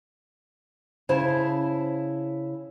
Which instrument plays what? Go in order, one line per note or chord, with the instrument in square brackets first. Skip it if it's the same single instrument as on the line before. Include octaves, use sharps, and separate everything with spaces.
[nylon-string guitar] C#3 E4 C5 A5